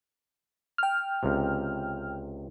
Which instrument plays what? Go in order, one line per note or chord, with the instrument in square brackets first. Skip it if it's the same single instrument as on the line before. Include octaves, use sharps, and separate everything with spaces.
[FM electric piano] G5 F6
[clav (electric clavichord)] C#2 C3